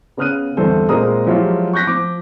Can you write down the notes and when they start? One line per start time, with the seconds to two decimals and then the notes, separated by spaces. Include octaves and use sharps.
0.17 C#3 B3 D#6 F6 F#6 D#7
0.57 G1 E2 C4 A4 C5
0.89 A#2 G#3 C4 A#4 A#5 D#6
1.26 F3 F#3 G#3 E4 F4 G4
1.73 C#6 F#6 G6 A#6 B6
1.87 F3 D6